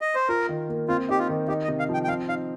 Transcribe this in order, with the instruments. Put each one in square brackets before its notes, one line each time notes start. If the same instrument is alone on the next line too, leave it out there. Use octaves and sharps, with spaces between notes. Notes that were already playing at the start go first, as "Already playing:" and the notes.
[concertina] D#5
C5
[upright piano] F4 [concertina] A#4
[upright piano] D#3
A#3
[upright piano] C4 [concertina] F4
[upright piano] D#4 [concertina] G4
[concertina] F4
[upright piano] D#3
[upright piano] D#4 [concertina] G4
[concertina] D#5
[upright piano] C3
[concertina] F5
[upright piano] F3 [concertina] G5
[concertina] G5
[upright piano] C4 [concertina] F5
[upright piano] D#4 [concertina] F5